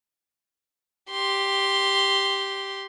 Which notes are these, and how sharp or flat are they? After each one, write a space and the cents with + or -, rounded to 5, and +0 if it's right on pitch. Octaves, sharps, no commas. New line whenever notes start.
G4 +0 C6 +0